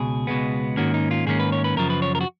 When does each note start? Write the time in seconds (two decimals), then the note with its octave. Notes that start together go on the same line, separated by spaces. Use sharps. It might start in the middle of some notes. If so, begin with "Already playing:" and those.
Already playing: C#2 B2 G#4
0.27 C#2 B2 G#3 B3
0.77 G#2 D#3 A#3 C#4 F#4
0.94 D#4
1.11 F4
1.27 G#2 D#3 A#3 C#4 G#4
1.40 B4
1.52 C#5
1.64 B4
1.76 F#2 C#3 F3 A#4
1.90 B4
2.02 C#5
2.15 A#4
2.21 F#4